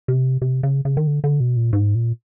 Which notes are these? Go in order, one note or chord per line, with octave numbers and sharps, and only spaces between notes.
C3
C3
C#3
C#3
D#3
D3
D3
B2
A#2
G#2
A#2